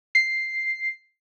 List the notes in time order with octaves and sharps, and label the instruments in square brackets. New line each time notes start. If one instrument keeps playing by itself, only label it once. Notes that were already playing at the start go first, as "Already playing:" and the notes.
[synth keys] C7